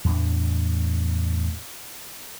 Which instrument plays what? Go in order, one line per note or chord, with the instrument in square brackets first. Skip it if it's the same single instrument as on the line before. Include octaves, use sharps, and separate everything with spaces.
[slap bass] E2 A2 A3 D4